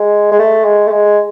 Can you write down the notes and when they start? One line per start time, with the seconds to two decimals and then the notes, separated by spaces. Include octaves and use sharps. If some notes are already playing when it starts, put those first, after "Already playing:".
Already playing: G#3
0.32 G#3
0.39 A3
0.65 G#3
0.87 A3
0.91 G#3